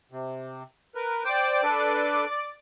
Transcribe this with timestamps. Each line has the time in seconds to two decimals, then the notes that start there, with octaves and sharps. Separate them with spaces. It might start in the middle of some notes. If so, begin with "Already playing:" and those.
0.12 C3
0.95 A#4 B4
1.24 C5 D5 G5 D6
1.63 D4 A4 B4